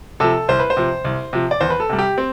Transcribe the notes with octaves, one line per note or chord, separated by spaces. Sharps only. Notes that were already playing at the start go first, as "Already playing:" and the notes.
C3 F3 A4
C2 C5
B4
C5
C3 F3
C2
C3 F3
D5
E2 C5
B4
A4
C3 G3
G4
C4